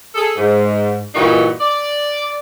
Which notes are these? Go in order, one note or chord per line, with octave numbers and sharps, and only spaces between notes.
G#4 A4
G#2
G2 A#2 E3 D#4 F#4 G4
D5